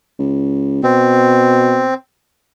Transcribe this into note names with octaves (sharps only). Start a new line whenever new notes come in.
C#2
B2 C4